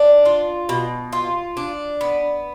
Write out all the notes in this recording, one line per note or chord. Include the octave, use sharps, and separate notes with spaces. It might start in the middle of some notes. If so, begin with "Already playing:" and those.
Already playing: D4
F4
B2
F4
D4
B3